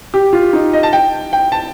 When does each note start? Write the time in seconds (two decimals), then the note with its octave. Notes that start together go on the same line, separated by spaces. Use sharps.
0.14 G4
0.33 F4
0.53 D#4
0.73 D#5
0.83 A5
0.93 G5
1.33 G5
1.52 A5